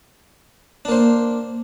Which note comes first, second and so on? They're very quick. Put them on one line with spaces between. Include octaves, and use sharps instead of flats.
D4 A#3 C5